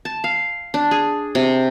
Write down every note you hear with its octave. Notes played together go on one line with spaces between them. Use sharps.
A5
F5
D4
G#4
C3